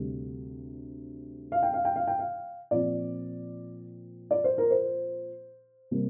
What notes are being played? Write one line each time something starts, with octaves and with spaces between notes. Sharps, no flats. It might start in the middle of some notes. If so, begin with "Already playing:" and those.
Already playing: D2 C3 G3
F5
G5
F5
G5
F5
G5
F5
A#2 F3 C4 D5
D5
C5
A#4
C5
C3 G3 A#3